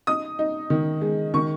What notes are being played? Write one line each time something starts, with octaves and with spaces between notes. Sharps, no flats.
D#4 D#6
D#4
D#3
G#3
D#3 C#6